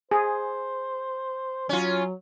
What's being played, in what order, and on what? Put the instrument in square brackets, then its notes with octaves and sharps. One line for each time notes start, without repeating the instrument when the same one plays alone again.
[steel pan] G#4 [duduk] C5
[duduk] F#3 [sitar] C#4 F4